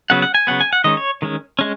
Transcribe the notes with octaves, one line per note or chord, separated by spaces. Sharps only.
C#3 F#3 B3 F#5
F#5
G#5
C#3 F#3 B3 F#5
G#5
F#5
D#3 G#3 C#4 D#5
C#5
D#3 G#3 C#4
G#3 C#4